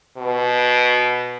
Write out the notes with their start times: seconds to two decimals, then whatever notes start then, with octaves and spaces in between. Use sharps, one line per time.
0.17 B2